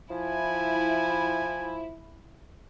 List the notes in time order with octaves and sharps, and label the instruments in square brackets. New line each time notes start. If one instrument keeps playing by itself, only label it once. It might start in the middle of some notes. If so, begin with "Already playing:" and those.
[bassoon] F3 [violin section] E4 [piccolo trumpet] G#5